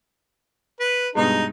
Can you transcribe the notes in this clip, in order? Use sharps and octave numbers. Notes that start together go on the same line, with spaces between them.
B4
G2 B2 G#3 D#4